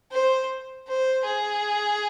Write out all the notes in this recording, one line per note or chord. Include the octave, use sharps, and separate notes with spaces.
C5
C5
G#4